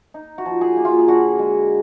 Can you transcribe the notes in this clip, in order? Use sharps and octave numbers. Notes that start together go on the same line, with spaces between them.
D#4
F#4
F3
G#4
A#3
F4
G#4
D3 F#4
G#3